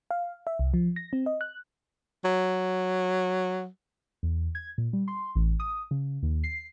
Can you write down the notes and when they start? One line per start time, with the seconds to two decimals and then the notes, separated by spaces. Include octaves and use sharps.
0.11 F5
0.47 E5
0.59 C2
0.74 F3
0.96 A#6
1.13 C4
1.26 D#5
1.41 F#6
2.25 F#3
4.23 E2
4.55 G#6
4.78 A#2
4.93 G3
5.08 C6
5.35 A1
5.60 D#6
5.91 C#3
6.23 D#2
6.44 C7